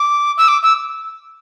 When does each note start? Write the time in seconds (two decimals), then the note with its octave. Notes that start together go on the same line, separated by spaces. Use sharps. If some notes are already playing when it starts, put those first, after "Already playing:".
Already playing: D6
0.37 E6
0.48 D6
0.63 E6